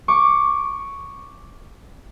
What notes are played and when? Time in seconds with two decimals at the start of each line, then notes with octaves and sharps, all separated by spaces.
0.08 C#6 D6